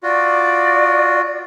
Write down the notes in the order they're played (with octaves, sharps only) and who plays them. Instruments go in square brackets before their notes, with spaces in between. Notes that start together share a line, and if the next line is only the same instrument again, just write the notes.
[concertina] F4 F#4 [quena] D5